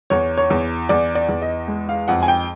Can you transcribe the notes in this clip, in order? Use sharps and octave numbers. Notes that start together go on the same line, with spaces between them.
E2 C#5
C#5
E2
E2 D5
D5
E2
D#5
G#3
F5
F2 F#5
G#5
G5